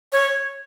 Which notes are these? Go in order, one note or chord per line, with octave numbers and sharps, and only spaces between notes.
C#5